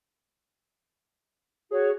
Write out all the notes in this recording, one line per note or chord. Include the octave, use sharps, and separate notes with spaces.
F#4 G#4 C#5